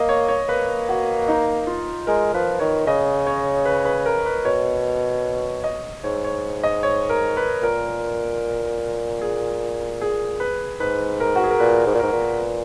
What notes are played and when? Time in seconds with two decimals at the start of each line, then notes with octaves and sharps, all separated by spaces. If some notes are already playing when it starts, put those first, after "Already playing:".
Already playing: A#3 D#5
0.09 C#5
0.28 C#5
0.49 A#3 B4
0.89 F#4
1.28 D#4
1.67 F4
2.07 G#3 A#4
2.34 F3 B4
2.60 D#3 C#5
2.87 C#3 D#5
3.27 C#5
3.65 B4
3.85 B4
4.06 A#4
4.26 B4
4.45 B2 C#5
5.64 D#5
6.04 G#2 C#5
6.25 C#5
6.64 D#5
6.83 C#5
7.09 A#4
7.37 B4
7.62 A#2 A#4
9.21 G#4
10.01 G#4
10.40 B4
10.80 G#2 B4
11.20 A#4
11.36 F#4
11.44 G#4
11.51 A#4
11.59 A#2 B4
11.86 G#2
11.95 A#2
11.99 G#2 A#4
12.13 A#2
12.39 B4